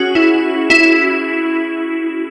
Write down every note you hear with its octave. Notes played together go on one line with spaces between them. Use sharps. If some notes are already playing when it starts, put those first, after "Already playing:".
Already playing: C#4 F#4 G#4
E4
E4